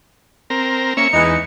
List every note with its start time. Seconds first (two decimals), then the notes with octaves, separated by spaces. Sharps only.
0.50 C4 A#4
0.97 A#3 C#4 E5 C#7
1.13 E2 E3 G#3 D#4